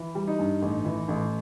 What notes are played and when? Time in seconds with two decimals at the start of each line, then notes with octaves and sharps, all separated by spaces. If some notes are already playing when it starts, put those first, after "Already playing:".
Already playing: E3
0.15 G3
0.27 D#4
0.39 G2
0.62 A1
0.85 E3
1.08 A1